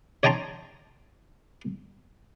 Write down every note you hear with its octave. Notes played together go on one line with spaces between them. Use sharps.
C#5 D#5 G5 A5 A#5 C6